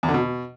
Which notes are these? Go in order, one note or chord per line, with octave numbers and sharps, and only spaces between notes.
E2
D3
B2